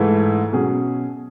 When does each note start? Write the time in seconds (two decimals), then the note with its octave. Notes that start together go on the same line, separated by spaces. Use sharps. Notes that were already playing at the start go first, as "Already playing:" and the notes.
Already playing: G#2 E3 A3 E4
0.52 B2 F#3 C#4 G#4